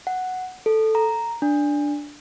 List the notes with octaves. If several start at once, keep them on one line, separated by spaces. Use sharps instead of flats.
F#5
A4
A#5
D4